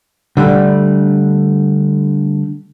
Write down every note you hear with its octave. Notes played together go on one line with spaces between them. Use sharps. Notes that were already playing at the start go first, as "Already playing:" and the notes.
D3 G3 A3